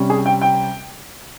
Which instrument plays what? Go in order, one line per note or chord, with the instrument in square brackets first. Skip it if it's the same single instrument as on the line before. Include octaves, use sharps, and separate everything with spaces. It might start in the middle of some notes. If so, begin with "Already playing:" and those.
Already playing: [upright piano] C3 G3 C#4
G#4
G5
G5